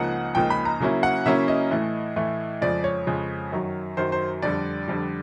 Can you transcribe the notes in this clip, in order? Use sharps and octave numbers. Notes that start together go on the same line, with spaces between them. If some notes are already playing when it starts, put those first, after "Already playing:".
Already playing: C#2 C#3 F3 A#3 D#4 F#5
C#2 C#3 F3 A#3 D#4 G5
B5
A#5
C#3 F#3 A#3 C#4 E4
F#5
C#3 F#3 A#3 C#4 E4 E5
D#5
A2 E3 A3
A2 E3 A3
F2 C#3 F3 G#3 D5
C#5
F2 C#3 F3 G#3
F#2 D#3 F#3
F#2 D#3 F#3 C5
C5
F2 D3 G3 D5
F2 D3 G3